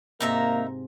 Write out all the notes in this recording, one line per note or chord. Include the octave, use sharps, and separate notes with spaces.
G#2 C3 A#3 D#4 E5 A5 A#5